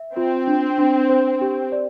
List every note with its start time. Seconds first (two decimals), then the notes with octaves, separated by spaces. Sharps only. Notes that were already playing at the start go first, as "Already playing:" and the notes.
Already playing: E5
0.16 C4 F4
0.47 D4
0.78 D4
1.09 C5
1.41 G4
1.72 D5